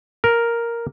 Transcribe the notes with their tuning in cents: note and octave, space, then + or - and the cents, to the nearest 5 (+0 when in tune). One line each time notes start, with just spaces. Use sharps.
A#4 +0